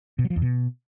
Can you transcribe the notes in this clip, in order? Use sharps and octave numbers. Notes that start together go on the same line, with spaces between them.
B2
F#3
F3
E2
B2